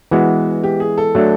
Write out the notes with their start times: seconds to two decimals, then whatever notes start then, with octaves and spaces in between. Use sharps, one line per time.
0.11 E3 G#3 B3 F#4
0.64 G4
0.80 G#4
0.98 A4
1.15 F#3 A3 D4